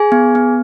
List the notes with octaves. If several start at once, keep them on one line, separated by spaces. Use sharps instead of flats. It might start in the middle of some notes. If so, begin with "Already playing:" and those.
Already playing: G#4 G#5
B3
B3